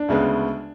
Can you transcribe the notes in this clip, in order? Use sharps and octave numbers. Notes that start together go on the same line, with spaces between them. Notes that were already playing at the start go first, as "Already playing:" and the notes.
Already playing: D4
D2 C#3 G#3 B3